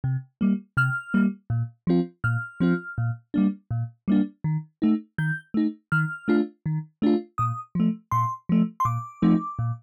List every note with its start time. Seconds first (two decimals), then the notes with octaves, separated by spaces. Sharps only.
0.04 C3
0.41 G3 A#3
0.77 C3 F6
1.14 G3 A#3
1.50 A#2
1.87 F3 C4 F4
2.24 A#2 F6
2.60 F3 C4 F4
2.98 A#2
3.34 G3 A#3 D4
3.71 A#2
4.08 G3 A#3 D4
4.44 D#3
4.82 A3 D#4
5.18 D#3 G6
5.54 A3 D#4
5.92 D#3 F6
6.28 A3 D4 F4
6.66 D#3
7.02 A3 D4 F4
7.38 A#2 D#6
7.75 F3 A3
8.11 A#2 C6
8.49 F3 A3
8.80 C6
8.85 A#2 D6
9.22 F3 A3 C4 D#4
9.59 A#2